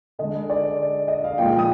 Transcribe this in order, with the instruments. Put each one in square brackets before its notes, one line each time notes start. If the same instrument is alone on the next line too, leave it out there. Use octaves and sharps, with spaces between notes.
[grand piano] D3 G#3 D#5
D5
D#5
F5
A#2 F3 G#3 G5
G5
D#6